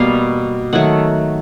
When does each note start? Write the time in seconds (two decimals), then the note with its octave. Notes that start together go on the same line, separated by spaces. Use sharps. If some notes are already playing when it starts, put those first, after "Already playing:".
Already playing: B2 G3 A#3 F5
0.73 D#3 F#3 A3 F#5